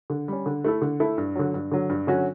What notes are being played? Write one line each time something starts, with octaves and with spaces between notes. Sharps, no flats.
D3
G3 C#4
D3
A3 E4 A4
D3
A3 E4 A4
G2
D3 F#3
G2
D3 F#3
G2
D3 F#3 C#4 F#4